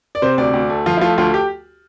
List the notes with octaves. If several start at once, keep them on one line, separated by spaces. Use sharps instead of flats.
D5
C3 C5
D2 D5
D2
A3
F3 F4
E4
A3 F4
D2 F4
G4